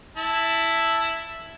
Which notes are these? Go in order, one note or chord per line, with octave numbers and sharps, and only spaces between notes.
E4 A5